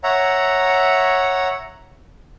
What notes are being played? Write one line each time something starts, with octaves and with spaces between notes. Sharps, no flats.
C#5 E5 F#5 A#5